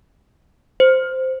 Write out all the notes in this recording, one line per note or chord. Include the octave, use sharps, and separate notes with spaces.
C5